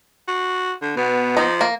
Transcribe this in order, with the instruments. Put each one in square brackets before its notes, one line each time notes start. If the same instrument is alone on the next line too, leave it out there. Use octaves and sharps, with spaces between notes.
[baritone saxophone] F#4
D3
[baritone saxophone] B2 [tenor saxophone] B3
[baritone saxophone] F3 [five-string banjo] D#4
[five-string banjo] A#3